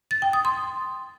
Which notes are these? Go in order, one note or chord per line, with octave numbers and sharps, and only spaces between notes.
A6
G5
D#6
C6